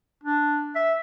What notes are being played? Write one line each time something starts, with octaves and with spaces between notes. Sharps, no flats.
D4
E5